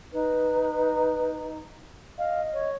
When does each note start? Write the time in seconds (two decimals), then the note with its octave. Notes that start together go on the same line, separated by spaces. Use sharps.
0.13 D#4 B4
2.18 D#5 F5
2.53 C#5